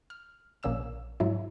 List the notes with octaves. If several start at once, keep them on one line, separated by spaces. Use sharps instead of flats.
F6
A#1 A#3 C#4 E6 E7
G#2 F#3 E4